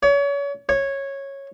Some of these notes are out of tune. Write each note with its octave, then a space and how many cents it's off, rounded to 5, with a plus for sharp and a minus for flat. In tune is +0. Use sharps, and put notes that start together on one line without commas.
C#5 +35
C#5 -10